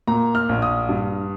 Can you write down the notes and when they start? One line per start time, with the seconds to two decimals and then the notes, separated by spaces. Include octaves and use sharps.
0.07 A#2 A#5
0.35 F6
0.49 A#1
0.62 D#6
0.89 G2